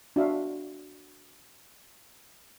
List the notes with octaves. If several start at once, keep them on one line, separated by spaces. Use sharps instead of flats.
D4 F#4 E5 F5